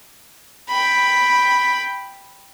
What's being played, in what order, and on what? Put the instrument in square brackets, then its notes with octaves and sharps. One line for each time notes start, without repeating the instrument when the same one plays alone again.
[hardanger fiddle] G5 B5